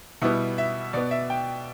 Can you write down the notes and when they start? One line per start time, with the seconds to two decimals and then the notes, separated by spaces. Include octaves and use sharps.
0.22 B2 G3 B3 E4
0.58 E5
0.93 B2 B3 D5
1.11 E5
1.30 G5